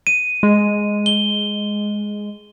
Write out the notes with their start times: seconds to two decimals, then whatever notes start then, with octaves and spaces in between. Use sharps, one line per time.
0.07 D#7
0.43 G#3
1.06 G7